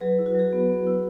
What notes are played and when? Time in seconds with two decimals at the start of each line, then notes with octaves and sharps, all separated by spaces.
0.01 F#3 G#4 B4
0.19 E4
0.26 F#4
0.35 F#3 G#4
0.53 B3
0.70 B3
0.87 E4